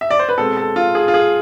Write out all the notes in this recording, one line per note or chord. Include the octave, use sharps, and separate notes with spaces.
E5
D5
C5
B4
B2 G#3 C4 A4
A4
F4
G#4
F4
G#4